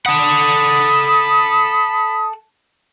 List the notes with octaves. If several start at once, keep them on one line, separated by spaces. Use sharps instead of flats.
A4 F#5 B5 D#6